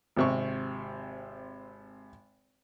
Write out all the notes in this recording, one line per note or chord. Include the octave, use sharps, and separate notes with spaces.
G#1 C3 C#6